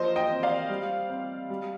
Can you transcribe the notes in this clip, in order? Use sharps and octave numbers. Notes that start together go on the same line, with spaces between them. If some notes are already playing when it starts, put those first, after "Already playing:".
Already playing: F3 A#3 C5 D#5
D#5 G5
C4
D5 F5
G3
C4
G3